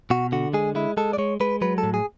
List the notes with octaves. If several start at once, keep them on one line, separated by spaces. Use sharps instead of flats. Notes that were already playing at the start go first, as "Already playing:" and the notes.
B2 F#4
D3 F#4
G#3 G#4
G#3 E4
G#3 A4
D5
G#3 C#5
G#3 B4
F#3 B4
A4
A2
G#4